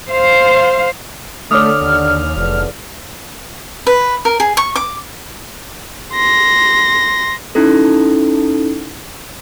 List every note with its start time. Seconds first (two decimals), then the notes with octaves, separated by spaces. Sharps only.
0.11 C5 F5
1.51 D3 A3 C#5 D6 D#6 F6
1.81 D#2
2.37 F1 E2 D3
3.87 B4
4.25 A#4
4.40 G#4
4.57 C#6
4.76 D6
6.13 C6 A#6
7.55 C#4 D#4 E4 A4